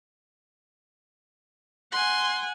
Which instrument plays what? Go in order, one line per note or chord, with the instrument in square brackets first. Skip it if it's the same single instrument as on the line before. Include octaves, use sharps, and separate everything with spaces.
[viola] F#5 G#5 [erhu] C6